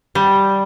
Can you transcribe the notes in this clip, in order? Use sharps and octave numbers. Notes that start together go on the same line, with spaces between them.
G3